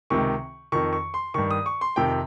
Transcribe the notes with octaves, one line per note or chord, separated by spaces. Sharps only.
C#2 C3 D#3 C#6
F2 D#3 C#6
C#6
C6
G2 D#3 C#6
D#6
C#6
C6
F2 C3 D#3 G5